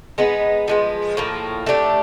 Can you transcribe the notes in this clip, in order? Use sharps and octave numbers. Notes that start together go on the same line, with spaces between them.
G#3 B3 D#4
F3 G#3 B3
A2 F3 A#3
A3 D4 G4